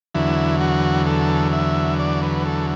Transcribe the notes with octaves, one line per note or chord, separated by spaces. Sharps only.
E2 D3 F#3 E4
F#4
A4
E5
D5
B4
A4